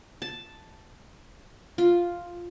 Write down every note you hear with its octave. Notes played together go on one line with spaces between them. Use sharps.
A5
F4